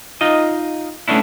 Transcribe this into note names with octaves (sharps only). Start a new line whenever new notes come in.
D#4 F4 D#5
A3 B3 C#4 D4 E4